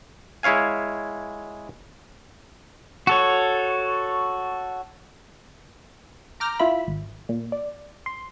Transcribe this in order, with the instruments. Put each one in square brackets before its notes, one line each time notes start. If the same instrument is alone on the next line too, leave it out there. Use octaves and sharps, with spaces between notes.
[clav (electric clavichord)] G#3 E4 C#5 F5 G#5
[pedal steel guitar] F#4 A4 C#5
[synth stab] A#5 D6 F6 G6 A#6
E4 F4 E5 B5
G#1
A#2
D5
C6